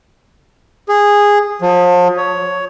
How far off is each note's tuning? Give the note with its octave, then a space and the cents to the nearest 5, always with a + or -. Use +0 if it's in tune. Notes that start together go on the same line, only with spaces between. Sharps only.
G#4 -15
F3 +35
C#5 +10